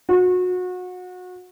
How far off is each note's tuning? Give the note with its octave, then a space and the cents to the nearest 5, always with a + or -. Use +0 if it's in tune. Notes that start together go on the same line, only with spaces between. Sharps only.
F#4 -30